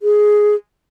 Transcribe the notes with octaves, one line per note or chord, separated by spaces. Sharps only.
G#4